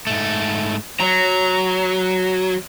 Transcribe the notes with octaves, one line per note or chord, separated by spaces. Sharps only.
G#2 A3
F#3 A#5